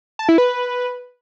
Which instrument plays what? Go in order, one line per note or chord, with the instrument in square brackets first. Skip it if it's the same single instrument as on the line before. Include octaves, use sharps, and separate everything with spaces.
[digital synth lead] A5
E4
B4